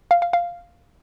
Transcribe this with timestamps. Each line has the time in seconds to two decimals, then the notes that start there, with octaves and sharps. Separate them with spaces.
0.11 F5
0.22 F5
0.33 F5